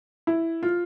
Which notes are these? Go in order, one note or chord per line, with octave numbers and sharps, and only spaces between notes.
E4
F4